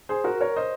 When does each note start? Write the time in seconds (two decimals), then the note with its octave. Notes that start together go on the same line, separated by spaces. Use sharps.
0.09 G#4 C5
0.24 F#4 A#4
0.41 A#4 C#5
0.56 C5 D#5